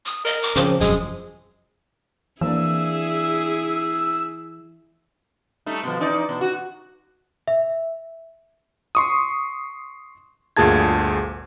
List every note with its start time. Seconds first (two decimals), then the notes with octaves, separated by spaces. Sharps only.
0.06 D#6
0.25 A#4 D#5
0.43 D6
0.56 C#3 F3 C4 D6
0.80 E1 F#2 G#3 D#6
2.41 E3 A#3 C4 D4 E4 G#4 E6
5.66 G3 A3 D#4
5.84 B2 F3
6.01 E3 D#4 D5
6.29 B2
6.41 F#4
7.48 E5
8.95 C6 C#6 D#6
10.57 G1 D2 A#2 G#4 A5 G#6